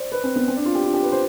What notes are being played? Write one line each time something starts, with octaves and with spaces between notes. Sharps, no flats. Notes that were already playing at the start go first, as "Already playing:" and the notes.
Already playing: C5 D5
B4
C4
B3
C4
D4
F4
G4
F4
G4
B4
C5